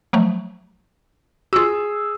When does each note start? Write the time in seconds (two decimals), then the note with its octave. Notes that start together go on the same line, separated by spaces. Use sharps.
0.13 F3 F#3 A3
1.53 F4 F#4 G#4 E6